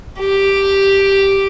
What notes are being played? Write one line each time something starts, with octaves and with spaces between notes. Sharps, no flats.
G4